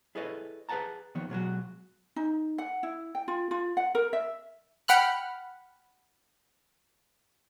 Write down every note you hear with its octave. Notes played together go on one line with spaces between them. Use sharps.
E4 G#4 A4 B4 C#5 D#5
G#4 B4 D5 F#5 A5 A#5
D#2 D#3 F3 B3 C#5
B2 F#3 G#3 F#4
D#4
F#5
E4
G5
F4
F4
F#5
A#4
E5
F#5 G5 B5 F6 F#6